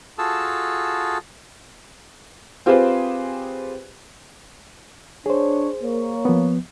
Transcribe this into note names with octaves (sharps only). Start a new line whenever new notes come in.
F4 F#4 G#4 A4 A5 E6
C4 F4 G4 G#4 B4 C5
D4 G#4 C5 C#5
A#3 C#5
F3 B3